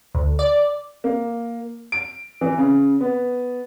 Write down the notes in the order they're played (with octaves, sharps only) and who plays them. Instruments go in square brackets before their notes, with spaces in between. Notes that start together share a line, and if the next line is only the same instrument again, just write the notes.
[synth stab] D2
D5
[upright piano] A#3
D7
E3
C#3
B3